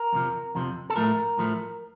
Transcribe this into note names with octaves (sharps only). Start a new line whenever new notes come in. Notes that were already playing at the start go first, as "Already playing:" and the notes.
Already playing: A#4
F2 C3 F3
F2 C3 F3
A4
A2 F3 A3 A#4
A2 F3 A3